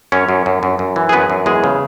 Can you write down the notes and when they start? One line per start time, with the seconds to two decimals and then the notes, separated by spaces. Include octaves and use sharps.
0.12 F#2 C#4 C#5
0.29 F#2
0.46 F#2
0.63 F#2
0.79 F#2
0.96 E3
1.09 G#4
1.12 F#2 B3 B4
1.30 F#2
1.46 E2 G#3 G#4
1.64 C#3